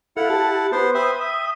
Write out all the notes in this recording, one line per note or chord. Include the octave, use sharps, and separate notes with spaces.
E4 A4 F5 F#5
G4 A5
B3 C5
B4 C5 E5 G5 D#6
E5